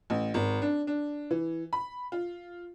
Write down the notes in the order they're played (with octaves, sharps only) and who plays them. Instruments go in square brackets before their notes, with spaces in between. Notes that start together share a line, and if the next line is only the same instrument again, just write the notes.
[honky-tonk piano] A1
G#1
D4
D4
E3
B5
F4